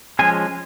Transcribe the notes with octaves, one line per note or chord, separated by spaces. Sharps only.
F3 G#3 C#4 G#4 G#5